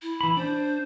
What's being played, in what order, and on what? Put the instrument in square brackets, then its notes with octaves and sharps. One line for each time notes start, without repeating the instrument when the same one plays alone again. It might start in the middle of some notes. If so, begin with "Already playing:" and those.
[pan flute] E4
[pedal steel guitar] E3 B5
[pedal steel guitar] D4 [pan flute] C5